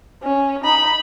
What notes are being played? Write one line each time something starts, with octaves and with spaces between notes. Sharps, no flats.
C#4
D#4 B5